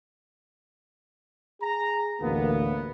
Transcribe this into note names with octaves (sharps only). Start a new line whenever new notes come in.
G#4 A#5
A1 D2 A#3 B3